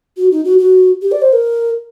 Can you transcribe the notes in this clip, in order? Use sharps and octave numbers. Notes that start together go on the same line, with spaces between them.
F#4
D#4
F#4
F#4
G4
D5
C5
A#4